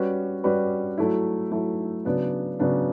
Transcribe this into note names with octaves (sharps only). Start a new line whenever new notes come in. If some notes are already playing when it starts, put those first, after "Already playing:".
Already playing: G3 C#4 F#4 B4 D5
G3 C#4 F#4 B4 D5
F#3 A3 E4
F#3 A3 E4
C#3 F#3 B3 D4
C#3 F#3 B3 D4